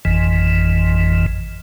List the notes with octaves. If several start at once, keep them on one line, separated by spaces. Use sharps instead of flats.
G#1 F2 E3